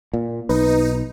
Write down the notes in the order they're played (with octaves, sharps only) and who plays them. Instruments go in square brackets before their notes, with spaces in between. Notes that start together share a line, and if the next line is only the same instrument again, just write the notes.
[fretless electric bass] A#2
[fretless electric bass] B1 [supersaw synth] D#4 [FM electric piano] B4